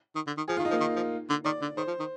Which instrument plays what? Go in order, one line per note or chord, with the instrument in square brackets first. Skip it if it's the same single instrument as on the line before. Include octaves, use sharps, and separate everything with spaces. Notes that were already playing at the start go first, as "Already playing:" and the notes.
[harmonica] D#3
D3
D#3
[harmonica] F3 [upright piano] G#4
[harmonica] D#3 [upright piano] F4
[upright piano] D#4
[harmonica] F3 [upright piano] A#3
[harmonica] D#3
F3
D3
[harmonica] D#3 [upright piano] D5
[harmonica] D3
[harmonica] D#3 [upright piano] C5
[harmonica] F3
D#3